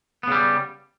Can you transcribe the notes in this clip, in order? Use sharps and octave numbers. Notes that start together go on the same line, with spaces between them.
C#3 G3 B3